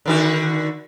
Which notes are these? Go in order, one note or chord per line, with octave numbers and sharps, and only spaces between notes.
D3 D#3 F#4